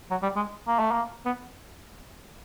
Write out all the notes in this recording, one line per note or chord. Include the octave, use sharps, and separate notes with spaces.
F#3
G3
G#3
A#3
A3
A#3
B3